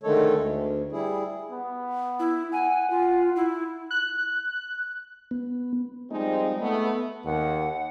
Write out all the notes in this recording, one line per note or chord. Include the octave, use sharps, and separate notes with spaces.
D3 D#3 G#3 A3 A4 C#5
D2
G3 E4 G#4
B3
E4
F#5 G#5
F4
E4
F#6
B3
F3 G3 G#3 C4 D#4
A3 B3
D#2 F#5